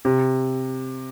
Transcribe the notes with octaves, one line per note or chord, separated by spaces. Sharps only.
C3